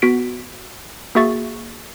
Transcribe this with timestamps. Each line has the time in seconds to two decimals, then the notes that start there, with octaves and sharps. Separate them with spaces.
0.02 B3 F#4 B6 D7
1.15 A#3 F#4 G#4 E5 C#6 A6